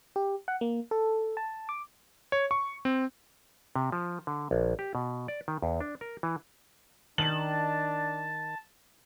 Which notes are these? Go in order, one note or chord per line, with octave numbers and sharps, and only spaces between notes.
G4
F#5
A#3
A4
A5
D6
C#5
C#6
C4
C3
F3
D3
A#1
G4
B2
D5
D#3
E2
D4
A#4
E3
D#3 D4 A5 F#7